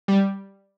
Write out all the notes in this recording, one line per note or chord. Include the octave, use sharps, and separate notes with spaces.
G3